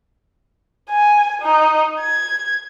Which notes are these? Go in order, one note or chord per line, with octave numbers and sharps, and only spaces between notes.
G#5
D#4
G#6